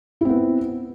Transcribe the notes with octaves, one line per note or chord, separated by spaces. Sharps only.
B3 C4 E4